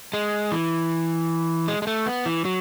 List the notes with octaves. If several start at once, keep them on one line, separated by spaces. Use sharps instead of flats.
G#3
E3
G#3
G#3
A3
B3
E3
F#3